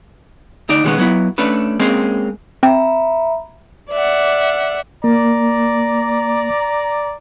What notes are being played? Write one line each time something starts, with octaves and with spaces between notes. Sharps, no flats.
D2 D#4 D5
B2 D#3 G3 G#3 B3 C#4
F#3 B3 E4
A3 C#4 D4 B4
G#3 A#3 C4 C#4
C4 E5 G5 A#5 B5
D5 E5 F#5
A#3 D5 A#5